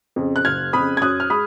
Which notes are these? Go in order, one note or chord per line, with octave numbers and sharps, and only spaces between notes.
F2 C#3
F#6
F#1 F6 G#6
F2 C#3 B5 D#6
G#6
F#2 D#6 F#6
F6
G#3 B5 D#6